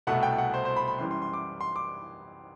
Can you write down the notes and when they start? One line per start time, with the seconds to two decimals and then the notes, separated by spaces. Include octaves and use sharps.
0.07 C2 B2 A3 F#5
0.23 G5
0.38 F#5
0.54 C5
0.65 C5
0.76 B5
0.87 B5
0.98 F#2 E3 G3 C6
1.11 C6
1.22 C6
1.34 D6
1.61 C6
1.76 D6